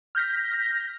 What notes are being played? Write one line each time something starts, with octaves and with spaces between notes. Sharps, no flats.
F6 G6 A#6 B6